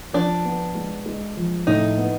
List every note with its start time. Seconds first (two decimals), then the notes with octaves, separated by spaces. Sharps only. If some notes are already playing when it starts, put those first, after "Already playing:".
0.13 F3 D4
0.45 B3
0.75 G#3
1.06 G#3
1.37 F3
1.67 A2 D#4
1.98 B3